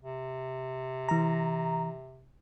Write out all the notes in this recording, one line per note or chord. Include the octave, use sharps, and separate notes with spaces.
C3
E3 A#5